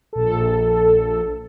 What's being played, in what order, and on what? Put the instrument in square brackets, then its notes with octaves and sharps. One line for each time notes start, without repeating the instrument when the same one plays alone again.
[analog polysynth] A#1 A4